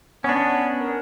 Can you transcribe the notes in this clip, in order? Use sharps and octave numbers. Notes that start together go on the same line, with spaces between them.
B3 C#4 D4
A#4